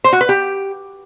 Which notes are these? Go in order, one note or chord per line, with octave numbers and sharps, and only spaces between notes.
C5
F#4
B4
G4